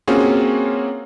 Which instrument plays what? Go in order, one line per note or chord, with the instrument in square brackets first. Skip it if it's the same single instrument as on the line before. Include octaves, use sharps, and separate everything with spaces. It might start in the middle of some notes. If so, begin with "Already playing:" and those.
[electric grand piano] A#3 C4 C#4 F4 F#4 G#4